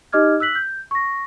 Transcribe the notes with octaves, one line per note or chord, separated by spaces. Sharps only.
D#4 G4 D#5 D6 F6 G#6
E6 F#6 B6 F#7
G6
C#6 A#6